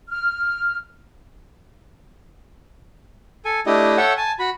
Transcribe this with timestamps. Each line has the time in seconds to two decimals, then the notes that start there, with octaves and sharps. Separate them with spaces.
0.09 F6
3.45 A4 G#5
3.66 A3 D4 E4 G4 D#5
3.97 A4 C#5 E5 F#5 G5
4.17 G#5 A5
4.39 F#4 B5